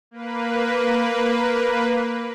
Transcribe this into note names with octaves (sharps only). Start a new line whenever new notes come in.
A#3 B4